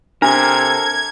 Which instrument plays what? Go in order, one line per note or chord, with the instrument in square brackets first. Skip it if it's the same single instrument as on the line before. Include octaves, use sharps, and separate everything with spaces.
[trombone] C3 [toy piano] D4 [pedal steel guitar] A4 A#4 [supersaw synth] G#6